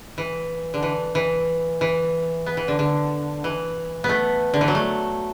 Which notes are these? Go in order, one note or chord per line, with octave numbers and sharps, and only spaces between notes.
E3
D3
E3
E3
E3
B3
E3
D3
D3
E3
B3
A3
D3
E3
F#3
A3